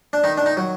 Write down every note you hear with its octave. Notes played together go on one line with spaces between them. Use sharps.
D4
D#3 D#4
D4
D#4
F#3